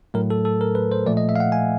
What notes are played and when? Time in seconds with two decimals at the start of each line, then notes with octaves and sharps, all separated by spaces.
0.14 A2 F#3 A3 A#4
0.30 A4
0.45 A4
0.61 A#4
0.75 B4
0.92 C5
1.06 A#2 F3 A3 D5
1.17 D#5
1.29 E5
1.36 F5
1.40 F#5
1.52 G#5